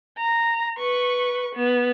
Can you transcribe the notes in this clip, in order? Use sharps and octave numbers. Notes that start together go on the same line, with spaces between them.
A#5
B4 C#6
B3